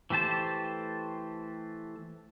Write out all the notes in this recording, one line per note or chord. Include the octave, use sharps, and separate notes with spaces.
E3 A3 G4 C5 A5